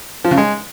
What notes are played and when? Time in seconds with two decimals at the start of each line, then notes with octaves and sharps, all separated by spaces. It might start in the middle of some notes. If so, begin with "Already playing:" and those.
0.25 F3
0.31 C#3
0.37 G#3